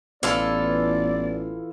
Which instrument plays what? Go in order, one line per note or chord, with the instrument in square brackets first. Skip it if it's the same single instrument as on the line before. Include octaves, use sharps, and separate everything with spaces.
[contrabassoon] A1 [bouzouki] E3 F4 A4 [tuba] B3 [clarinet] D5